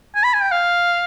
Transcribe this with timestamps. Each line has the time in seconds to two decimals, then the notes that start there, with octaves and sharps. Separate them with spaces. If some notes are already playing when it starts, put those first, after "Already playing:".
0.15 G#5
0.24 B5
0.34 G#5
0.42 G5
0.52 F5